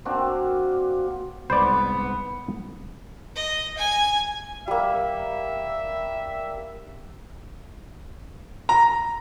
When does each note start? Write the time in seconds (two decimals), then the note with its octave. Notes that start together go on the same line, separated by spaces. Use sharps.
0.05 A#3 C4 D4 F#4
1.50 C2 G#2 B3 C5 D5 B5
3.36 D#5
3.78 G#5
4.68 G3 A#3 E5
8.69 A#5